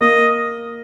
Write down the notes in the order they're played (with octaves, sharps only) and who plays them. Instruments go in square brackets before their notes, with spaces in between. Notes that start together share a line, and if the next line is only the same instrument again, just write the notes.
[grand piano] A#3 [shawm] D#5